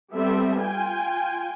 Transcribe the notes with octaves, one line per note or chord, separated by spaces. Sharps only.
G3 B3 C4 A4 E5
F4 G5 G#5